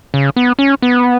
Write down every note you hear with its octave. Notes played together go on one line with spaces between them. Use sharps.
C#3
B3
C#4
B3